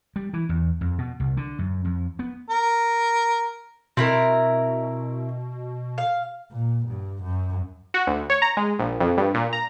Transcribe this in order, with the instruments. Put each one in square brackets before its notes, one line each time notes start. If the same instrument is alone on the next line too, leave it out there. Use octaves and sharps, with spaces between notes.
[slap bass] G3
E3
E2
F2
B2
C2
D3
F#2
F2
B3
[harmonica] A#4
[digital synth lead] B2 [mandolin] C4 E4 A#4
[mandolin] F5
[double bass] A#2
G2
F#2
[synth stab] F#4
D2
C#5
A#5
G#3
A#1
F2
G2
A#2
A#5